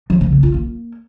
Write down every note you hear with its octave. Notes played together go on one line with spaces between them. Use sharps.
F3
C#3
A#3
F4
A#3